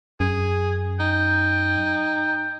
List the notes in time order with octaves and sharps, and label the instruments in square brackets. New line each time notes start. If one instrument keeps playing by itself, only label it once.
[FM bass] F#2 [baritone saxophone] G#4
[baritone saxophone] D#4 [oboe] G5